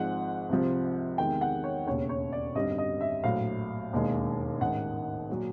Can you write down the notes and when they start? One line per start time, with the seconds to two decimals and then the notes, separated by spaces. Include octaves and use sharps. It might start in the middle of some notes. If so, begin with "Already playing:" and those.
Already playing: G#1 G#2 F3 G#3 F#5
0.49 C2 C3 F3
1.18 E2 C3 D#3 G#3 G5
1.41 F#5
1.64 C#5
1.86 E1 D#2 C#3 C#5
2.09 C#5
2.33 D5
2.55 G#1 F#2 D3 G3 D#5
2.78 D#5
3.01 E5
3.24 A#1 A2 F#3 F5
3.93 E1 D#2 D#3 G#3
4.60 A1 G#2 D#3 F#5
5.30 A#2 F#3